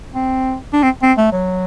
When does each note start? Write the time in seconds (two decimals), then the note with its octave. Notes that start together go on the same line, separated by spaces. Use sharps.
0.15 C4
0.73 D4
0.83 C4
1.02 C4
1.18 A3
1.32 F#3